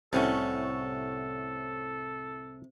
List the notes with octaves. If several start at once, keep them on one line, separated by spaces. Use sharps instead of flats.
C2 A2 C3 A3 C#4 F#4 A4